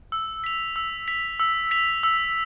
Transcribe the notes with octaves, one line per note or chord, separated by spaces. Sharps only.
E6
B6 F7
E6
B6 F7
E6
B6 F7
E6